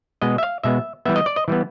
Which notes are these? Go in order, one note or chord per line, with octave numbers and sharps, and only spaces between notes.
B2 G#3 B3 D#5
E5
F5
B2 G#3 B3 E5
E3 G3 B3 E5
D#5
D5
D#5
E3 G3 B3